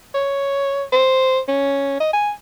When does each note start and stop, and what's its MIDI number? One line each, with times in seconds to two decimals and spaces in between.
0.14 0.83 73
0.92 1.39 72
1.48 1.95 61
2.00 2.11 75
2.13 2.31 80